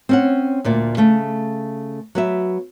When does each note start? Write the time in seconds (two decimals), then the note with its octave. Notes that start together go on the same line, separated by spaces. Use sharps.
0.09 C4 C#4 F#5
0.64 D2 A#2 D5
0.97 C#3 A3
2.15 F#3 B3 E5